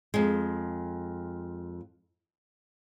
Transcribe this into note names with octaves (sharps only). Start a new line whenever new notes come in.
F2 G#3